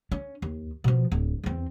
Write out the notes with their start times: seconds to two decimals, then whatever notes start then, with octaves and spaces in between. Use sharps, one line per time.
0.12 C#4
0.42 D#2
0.84 B2 F3
1.12 D1
1.44 E2 C4